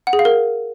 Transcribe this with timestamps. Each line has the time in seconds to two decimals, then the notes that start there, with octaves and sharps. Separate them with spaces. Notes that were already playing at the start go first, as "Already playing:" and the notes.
0.07 F#5
0.13 G#4
0.19 F5
0.25 A#4